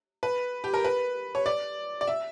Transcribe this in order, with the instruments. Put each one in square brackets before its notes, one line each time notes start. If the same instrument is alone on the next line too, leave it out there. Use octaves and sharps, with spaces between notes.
[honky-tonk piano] B4
G4
A#4
B4
C#5
D5
D5
E5